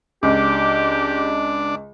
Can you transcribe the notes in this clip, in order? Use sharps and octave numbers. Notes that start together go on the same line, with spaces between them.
C#2 D4 G4